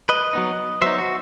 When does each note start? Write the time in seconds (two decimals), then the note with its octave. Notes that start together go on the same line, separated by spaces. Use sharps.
0.09 B4 D#5
0.33 F#3 B3 D#4
0.82 F#3 B3 D#4 C5 E5
0.98 F#4